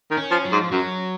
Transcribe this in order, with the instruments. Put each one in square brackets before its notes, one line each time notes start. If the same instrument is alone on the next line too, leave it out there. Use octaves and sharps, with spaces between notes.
[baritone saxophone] D#3
[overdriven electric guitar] C#4
[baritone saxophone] F3
[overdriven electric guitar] F#3
[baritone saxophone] G#2
[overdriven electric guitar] F3
[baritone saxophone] F#2 [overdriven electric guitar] F#3